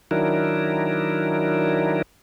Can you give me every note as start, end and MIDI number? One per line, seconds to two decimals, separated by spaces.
0.11 2.02 51
0.11 2.02 54
0.11 2.02 62
0.11 2.02 64
0.11 2.02 70